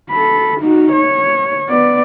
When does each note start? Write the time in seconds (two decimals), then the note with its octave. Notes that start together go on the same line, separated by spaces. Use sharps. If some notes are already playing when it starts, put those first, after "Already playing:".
0.10 A4 B5
0.61 D#4 F#4
0.92 C#5
1.68 B3 D5